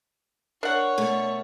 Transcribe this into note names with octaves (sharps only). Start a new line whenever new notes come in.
D4 A#4 C#5 F#5
B2 A3